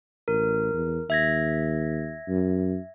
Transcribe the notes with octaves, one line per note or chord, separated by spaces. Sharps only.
A1 A#4
E2
D#2 E5 G#6 A#6
F#2